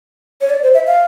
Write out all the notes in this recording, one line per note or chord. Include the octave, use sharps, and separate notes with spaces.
C#5
D5
C5
E5
F5